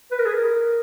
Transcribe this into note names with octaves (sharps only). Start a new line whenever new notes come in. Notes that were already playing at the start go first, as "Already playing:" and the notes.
B4
A#4
G#4
A#4